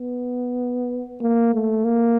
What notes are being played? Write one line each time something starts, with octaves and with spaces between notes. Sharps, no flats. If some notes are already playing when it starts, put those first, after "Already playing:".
Already playing: B3
A#3
A3
A#3